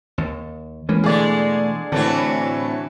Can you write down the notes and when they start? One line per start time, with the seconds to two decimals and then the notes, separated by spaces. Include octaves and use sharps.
0.18 D#2
0.89 E3 G#3 A#3 C#4
1.04 E2 B2 D3 G#3 A3 G#4 D5
1.92 A2 D3 E3 F#3 C4 D4 A4